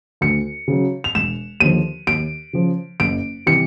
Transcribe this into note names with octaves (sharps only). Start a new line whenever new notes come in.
D2 C#7
C#3 F#3
F7
E1 E7
D#2 D3 F3 D#7
D#2 D7
C#3 F3
F#1 D7
C3 E3 G3 C#7